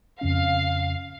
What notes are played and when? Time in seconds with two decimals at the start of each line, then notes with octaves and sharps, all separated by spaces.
0.21 F2 C#3 C#4 F5